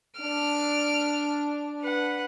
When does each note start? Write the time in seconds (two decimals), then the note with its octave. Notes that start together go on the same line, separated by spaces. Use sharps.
0.21 D4 F6 D7
1.82 B4 F#5